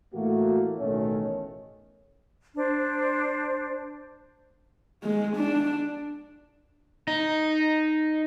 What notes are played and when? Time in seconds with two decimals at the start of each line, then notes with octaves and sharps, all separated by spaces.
0.14 A2 E3 A3 A#3 F#4
0.79 A1 B2 D#3 A3 C#4 C#5
2.56 D4 C5
5.03 G#3
5.36 D4
7.08 D#4